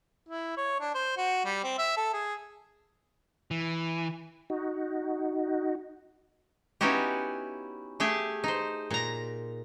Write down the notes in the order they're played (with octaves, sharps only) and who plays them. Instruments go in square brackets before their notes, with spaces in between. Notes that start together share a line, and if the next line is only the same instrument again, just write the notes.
[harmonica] E4
C#5
D4
C5
F#4
G3
C4
E5
A4
G#4
[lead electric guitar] E3
[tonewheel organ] D#4 F#4
[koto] B3 C#4 D#4 E4 F#4 G4
A3 G4 G#4 E5
D#4 C5
A#2 A#5